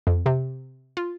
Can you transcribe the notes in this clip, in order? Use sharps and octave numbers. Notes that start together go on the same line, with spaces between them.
F2
C3
F4